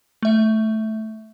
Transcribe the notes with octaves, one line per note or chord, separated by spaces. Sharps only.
A3 E5